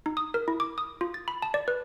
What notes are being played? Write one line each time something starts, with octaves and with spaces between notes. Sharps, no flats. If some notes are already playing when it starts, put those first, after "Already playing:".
D#4
D#6
A#4
E4
D6
D#6
F4
A6
B5
A5
D5
B4